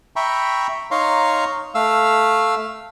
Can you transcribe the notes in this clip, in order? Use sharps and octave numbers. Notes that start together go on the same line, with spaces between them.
E5 G5 A#5 B5 C#6
D#4 C#5 F5 A#5 C6
A3 F5 E6